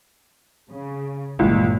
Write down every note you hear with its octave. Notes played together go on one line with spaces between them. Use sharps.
C#3
G1 C#2 A#2 E3